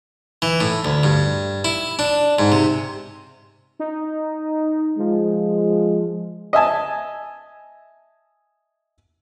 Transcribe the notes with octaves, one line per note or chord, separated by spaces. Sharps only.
E3
A2
D2
G2
E4
D4
G#2
C3
D#4
F3 G#3
D#5 E5 G#5 A5